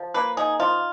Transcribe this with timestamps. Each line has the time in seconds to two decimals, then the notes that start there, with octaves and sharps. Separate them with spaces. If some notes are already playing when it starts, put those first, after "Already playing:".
Already playing: F3
0.14 A#3 B4
0.37 D#4 G#4
0.60 F3 F4